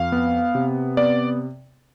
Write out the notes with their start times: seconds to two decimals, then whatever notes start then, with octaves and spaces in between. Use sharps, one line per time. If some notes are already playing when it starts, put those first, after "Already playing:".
Already playing: F2 F5
0.12 B3
0.55 C3
0.97 B3 D5